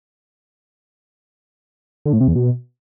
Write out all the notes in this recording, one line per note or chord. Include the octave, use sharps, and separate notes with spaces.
D3
A2
C3
E2
B2